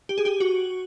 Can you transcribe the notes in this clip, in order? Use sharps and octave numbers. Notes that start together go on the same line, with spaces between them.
G4
G#4
G4
F#4